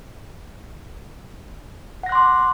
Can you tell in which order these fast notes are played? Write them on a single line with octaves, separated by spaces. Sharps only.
F#5 A#6 F#6 C6 D6